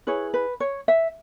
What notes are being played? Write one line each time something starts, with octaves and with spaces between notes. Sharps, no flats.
E4 G#4 B4 C#5
B4
C#5
E5